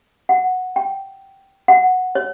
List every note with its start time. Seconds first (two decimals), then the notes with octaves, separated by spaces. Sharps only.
0.29 F#5
0.76 G5
1.68 F#5
2.15 C#5